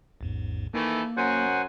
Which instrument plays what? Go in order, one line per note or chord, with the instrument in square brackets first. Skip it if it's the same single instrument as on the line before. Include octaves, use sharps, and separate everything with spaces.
[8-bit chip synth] A1 E2 G#2
[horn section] D#3 E3 A3 [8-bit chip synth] A#3
[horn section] F#2 F#3 G#5 [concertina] C5 F#5